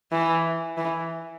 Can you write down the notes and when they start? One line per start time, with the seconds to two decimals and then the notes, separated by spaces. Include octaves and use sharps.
0.12 E3
0.77 E3